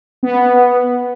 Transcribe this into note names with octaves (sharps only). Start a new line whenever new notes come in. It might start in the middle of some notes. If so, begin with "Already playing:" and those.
B3